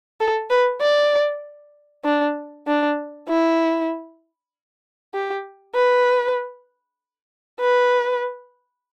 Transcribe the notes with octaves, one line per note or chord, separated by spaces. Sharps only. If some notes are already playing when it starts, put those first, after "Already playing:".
A4
B4
D5
D4
D4
E4
G4
B4
B4